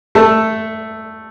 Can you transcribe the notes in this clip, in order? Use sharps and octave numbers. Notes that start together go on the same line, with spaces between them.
A3 A4